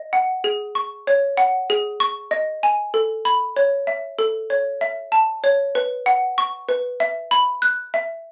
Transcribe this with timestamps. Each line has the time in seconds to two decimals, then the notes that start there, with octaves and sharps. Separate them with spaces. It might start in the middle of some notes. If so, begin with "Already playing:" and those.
Already playing: D#5
0.13 F#5
0.44 G#4
0.75 C#6
1.07 C#5
1.37 F#5
1.70 G#4
2.00 C#6
2.31 D#5
2.63 G#5
2.94 A4
3.25 B5
3.56 C#5
3.87 E5
4.19 A4
4.50 C#5
4.81 E5
5.12 A5
5.44 C#5
5.75 B4
6.06 F#5
6.38 C#6
6.69 B4
7.00 E5
7.31 B5
7.62 F#6
7.94 E5